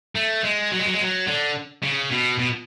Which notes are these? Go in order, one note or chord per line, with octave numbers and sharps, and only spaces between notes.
A3
G#3
F#3
G#3
F#3
G#3
F#3
D3
C#3
B2
B2